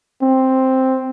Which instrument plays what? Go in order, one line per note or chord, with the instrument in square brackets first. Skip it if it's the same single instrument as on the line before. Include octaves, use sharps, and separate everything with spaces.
[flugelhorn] C4